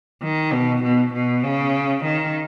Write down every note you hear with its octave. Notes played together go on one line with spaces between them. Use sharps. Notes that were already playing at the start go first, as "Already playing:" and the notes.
D#3
B2
B2
B2
C#3
D#3